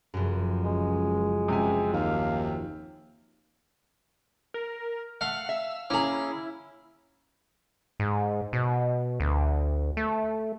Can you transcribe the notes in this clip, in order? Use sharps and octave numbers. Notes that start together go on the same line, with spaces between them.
F1 F#2
C#2 G#3
C#2 C3 G4 G#5
D#2 F5
A#4
A3 F5 F#5
E5 E6
A#3 C#4 E4 G#4 A#5
G#2
B2
D2
A3